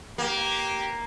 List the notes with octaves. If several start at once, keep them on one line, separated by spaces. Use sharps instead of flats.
A#3 G4